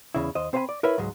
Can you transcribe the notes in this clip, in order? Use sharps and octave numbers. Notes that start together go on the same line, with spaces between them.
E2 C#3 E4
D#2 C5 D#5
C4 C5 C#5 F5 G#5 B5
D5
E4 A#4 B4 C#5 E5
C#2 G#2 F#3 G#3